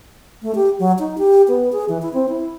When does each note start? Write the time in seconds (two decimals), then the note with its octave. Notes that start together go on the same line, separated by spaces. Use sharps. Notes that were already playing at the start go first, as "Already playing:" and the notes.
0.42 A3
0.55 G4
0.79 F#3
0.99 D#4
1.18 G4
1.48 B3
1.72 G#4
1.89 E3
2.02 E4
2.14 C4
2.29 E4